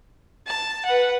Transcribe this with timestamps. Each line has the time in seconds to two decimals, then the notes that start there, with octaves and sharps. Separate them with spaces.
0.47 A5
0.86 B4 F#5